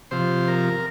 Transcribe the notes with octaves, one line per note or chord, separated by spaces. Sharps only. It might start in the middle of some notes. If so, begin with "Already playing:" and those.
C3 F3 C5
A#4